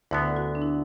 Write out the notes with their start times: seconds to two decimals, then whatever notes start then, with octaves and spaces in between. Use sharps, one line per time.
0.11 D2 D3 B3 E4
0.30 A4
0.36 F#4
0.55 D4
0.62 E4